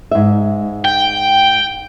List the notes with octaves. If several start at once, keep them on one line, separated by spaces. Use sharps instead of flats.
G#2 E5
G5